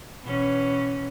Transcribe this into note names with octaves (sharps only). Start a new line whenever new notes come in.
B2 E3 C#4